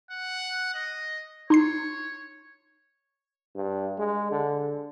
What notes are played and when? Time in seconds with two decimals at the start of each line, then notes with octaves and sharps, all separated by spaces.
0.10 F#5
0.75 D#5
1.50 D#4 C#5 C6 C7
3.56 G2
3.99 G#3
4.31 D3